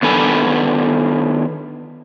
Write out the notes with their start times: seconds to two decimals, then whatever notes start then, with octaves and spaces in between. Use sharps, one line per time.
0.03 D#3 B3 D4 A4 B4 G#5